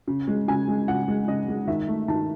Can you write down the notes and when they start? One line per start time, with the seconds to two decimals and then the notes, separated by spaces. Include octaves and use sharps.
0.07 C#3
0.28 G#3
0.48 C#3 G#5
0.68 G#3
0.88 C#3 F#5
1.08 G#3
1.28 C#3 D#5
1.48 G#3
1.67 D#3 E5
1.88 A3
2.08 D#3 A5